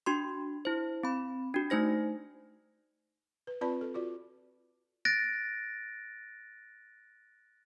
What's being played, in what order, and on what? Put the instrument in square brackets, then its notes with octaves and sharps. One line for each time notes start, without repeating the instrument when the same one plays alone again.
[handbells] D4 F#4 C6
E4 C5
C4 B5
D4 F#4
A3 D#4 C5 A#6
[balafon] B4
C4 F4 B4 D5 A5 B5
A4
F4 F#4 D5
[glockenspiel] F#6 A6 A#6 D7